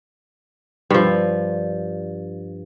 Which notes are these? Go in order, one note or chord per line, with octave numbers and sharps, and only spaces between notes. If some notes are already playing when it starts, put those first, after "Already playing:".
G2 F3